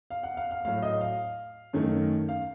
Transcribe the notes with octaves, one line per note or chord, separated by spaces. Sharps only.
F5
F#5
F5
F5
A2 F#3 A3 F5
D#5
F5
F#2 D#3 A3
F5